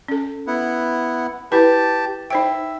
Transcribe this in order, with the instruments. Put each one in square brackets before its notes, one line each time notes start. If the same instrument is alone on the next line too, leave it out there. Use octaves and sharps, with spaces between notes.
[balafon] C#4 A4
[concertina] B3 E4 F#5
[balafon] E4 B4 [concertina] G4 A5
[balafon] D#4 C5 G5 [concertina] E5